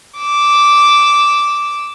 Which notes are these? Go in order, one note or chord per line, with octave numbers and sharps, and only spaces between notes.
D6 E6